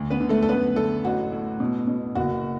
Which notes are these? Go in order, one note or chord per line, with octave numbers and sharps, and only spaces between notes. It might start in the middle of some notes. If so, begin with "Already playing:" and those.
Already playing: D2
B3 B4
D3
A3 A4
A4
F#2 B3 B4
D3 A3 A4
A1 F#4
A2
B2
B2
F#1 F#4